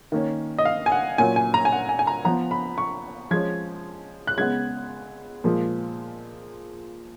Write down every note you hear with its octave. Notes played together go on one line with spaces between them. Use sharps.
D#3 A#3 C#4
D#5
F5
G#5
F#5
A#2 F#3 C#4 G#5
G#5
A#5
G#5
F#5
G#5
G#5
A#5
F3 B3 A#5
B5
C#6
F3 G#3 C#4 G#6
F#6
C#3 G#3 B3 G#6
A#2 F3 G#3